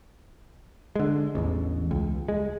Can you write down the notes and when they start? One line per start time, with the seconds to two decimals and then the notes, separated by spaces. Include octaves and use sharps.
0.96 D3 G#3
1.35 A1 E2
1.91 C#2
2.29 G#3